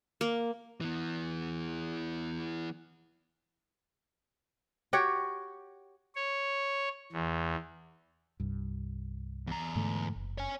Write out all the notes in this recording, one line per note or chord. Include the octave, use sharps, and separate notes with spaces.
A#3
E3 B3
F#4 G4 C#5 F#5
C#5
E2
C2 G2
E2 A#5
G#2 D3 A3
F#1
C#5 G#5